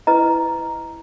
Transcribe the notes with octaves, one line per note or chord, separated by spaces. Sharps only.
E4 B4 D#5 A#5